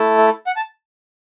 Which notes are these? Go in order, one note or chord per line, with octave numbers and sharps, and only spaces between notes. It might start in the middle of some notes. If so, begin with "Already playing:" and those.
Already playing: A3 E4 A4
E5
F#5
A5